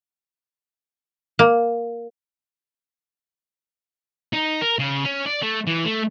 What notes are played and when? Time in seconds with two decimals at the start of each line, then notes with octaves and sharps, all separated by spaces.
1.39 A#3
4.33 D#4
4.61 A#4
4.79 C#3
5.05 C#4
5.27 D5
5.43 A3
5.67 E3
5.85 A3